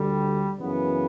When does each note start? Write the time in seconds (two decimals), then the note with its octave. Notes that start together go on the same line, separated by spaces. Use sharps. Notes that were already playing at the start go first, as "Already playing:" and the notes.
Already playing: D2 D3 G3
0.60 F#2 C#3 E3 B3